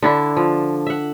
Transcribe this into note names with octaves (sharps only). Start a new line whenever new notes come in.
D3 D4 E4
F3
E5 F#5